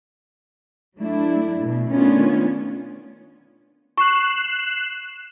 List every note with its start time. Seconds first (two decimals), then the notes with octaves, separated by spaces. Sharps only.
0.98 F#3 A3 D4 E4
1.60 B2
1.90 D#3 A3 B3 C#4 D4 F4
3.97 C#6 F#6 C7 E7